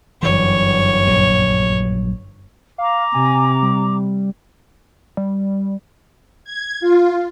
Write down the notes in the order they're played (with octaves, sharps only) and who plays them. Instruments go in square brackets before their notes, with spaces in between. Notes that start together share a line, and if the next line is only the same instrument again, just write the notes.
[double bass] G1 F#2 [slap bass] E3 F#3 [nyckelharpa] C#5
[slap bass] A#1 F#3 G3
[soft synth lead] F5 [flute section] A#5 D6
[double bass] C3 [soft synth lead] G#5
[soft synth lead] G3
[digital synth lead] G3
[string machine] G#6
F4